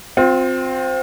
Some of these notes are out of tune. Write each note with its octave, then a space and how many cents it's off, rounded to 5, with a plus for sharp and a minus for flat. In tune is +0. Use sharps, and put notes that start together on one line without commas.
C4 +0 F4 +35